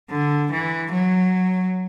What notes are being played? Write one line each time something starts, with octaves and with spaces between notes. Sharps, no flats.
D3
E3
F#3